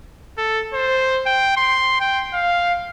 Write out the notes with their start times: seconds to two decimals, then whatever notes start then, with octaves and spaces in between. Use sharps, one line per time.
0.38 A4
0.74 C5
1.26 G5
1.57 C6
2.00 G5
2.34 F5